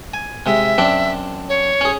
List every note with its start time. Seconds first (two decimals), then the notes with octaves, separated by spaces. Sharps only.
0.14 G#5
0.46 C3 G#3 E5
0.78 F#2 C4 D4
1.49 C#5
1.81 C#4 G#4